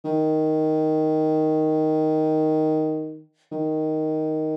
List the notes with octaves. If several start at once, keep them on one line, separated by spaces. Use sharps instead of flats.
D#3
D#3